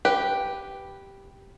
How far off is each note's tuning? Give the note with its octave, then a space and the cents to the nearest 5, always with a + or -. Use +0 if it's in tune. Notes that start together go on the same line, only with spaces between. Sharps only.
G4 +0 B4 +0